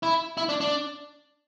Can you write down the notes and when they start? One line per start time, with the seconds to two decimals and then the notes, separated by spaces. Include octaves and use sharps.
0.03 E4
0.37 E4
0.49 D4
0.61 D4